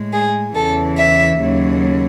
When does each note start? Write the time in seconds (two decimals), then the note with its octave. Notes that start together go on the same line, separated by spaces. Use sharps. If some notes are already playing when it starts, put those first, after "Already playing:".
Already playing: A2 G#3
0.13 G#4
0.55 E2 C#3 E3 A4
0.98 E5
1.40 D#2 C#3 F#3